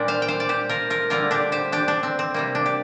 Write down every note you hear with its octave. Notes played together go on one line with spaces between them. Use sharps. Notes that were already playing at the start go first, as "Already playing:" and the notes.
Already playing: A#2 G3 A#3 D4 F4 G4 A#4
C5 F5
G5
C5 F5
D5
G4 C5
F4 A#4
F4 A#4
D3 G3 A#3 F4 A#4
D4 G4
G4 C5
D4 G4
D4
C4
C4
C3 G3 A#3
D4
G4